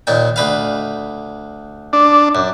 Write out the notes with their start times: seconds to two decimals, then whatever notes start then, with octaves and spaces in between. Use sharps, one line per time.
0.07 D#2 A#2 G5
0.36 D2 B4 F5
1.93 D4
2.35 F#2